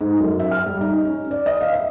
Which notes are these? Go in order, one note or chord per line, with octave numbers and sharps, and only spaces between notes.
G#2
F#2
E5
F6
G3
D#4
C#4
D5
D#5
F5
E5